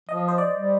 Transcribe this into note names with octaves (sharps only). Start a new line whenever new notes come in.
F3 D#5
C5
D5
G3